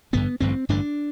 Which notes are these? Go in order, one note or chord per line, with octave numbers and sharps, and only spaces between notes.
A1 G2 D3 B3
A1 G2 D3 C4
A1 G2 D3 D4